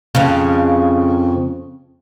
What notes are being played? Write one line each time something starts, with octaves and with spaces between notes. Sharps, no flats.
F2 C#3